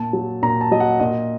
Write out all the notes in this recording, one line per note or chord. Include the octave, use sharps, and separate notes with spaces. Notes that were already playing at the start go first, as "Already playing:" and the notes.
Already playing: A#2 A5
F#3
A#2 A#5
A5
F#3 D#5
F#5
A#2 D#5